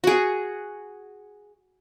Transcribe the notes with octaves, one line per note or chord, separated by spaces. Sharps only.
F#4 G#4